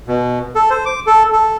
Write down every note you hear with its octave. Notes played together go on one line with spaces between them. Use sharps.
B2
A4
C5
D6
A4
A4